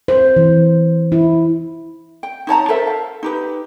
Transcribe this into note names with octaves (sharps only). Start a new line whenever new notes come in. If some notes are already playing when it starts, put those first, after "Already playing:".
C5
E3
E4
G5
D#4 C#5 A5 A#5
A4 A#4 C5 E5
F5
D#4 G4 B4